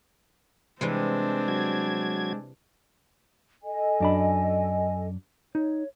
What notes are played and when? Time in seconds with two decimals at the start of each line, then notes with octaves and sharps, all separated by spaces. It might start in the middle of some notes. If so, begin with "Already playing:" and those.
0.81 C3 E3 G3 G#3 C4 D4
1.48 F#3 G#6
3.64 A4 D#5 G#5
4.00 F#2 D4 B5
5.55 D#4 C#5